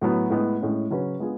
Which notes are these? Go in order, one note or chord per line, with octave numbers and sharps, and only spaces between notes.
A2 F#3 B3
A2 G#3 B3
A2 G#3 C#4
C#3 F#3 C#4 F#4 B4
G#3 B3 F4 G#4